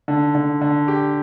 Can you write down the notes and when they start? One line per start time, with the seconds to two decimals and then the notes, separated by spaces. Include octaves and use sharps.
0.08 D3
0.35 D3
0.61 D3
0.88 G4